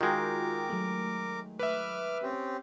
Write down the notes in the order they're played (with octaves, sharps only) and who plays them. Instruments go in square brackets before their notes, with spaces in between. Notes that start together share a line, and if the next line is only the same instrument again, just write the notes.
[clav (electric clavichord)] D#3 G#3 [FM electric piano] F4 F#4 G5 [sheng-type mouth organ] A#4 D6
[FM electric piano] F#3 A3
[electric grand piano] B4 E5 [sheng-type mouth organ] D6 F6
[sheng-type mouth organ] C4 C#4 G4